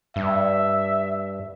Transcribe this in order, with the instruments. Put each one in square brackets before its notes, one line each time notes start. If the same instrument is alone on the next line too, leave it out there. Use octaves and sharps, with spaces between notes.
[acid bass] G2 [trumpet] E5